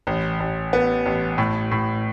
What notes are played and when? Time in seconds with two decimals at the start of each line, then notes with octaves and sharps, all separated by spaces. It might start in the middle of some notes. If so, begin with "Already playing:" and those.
0.07 A1
0.40 A1
0.73 B3
1.06 A1
1.38 A2
1.71 A2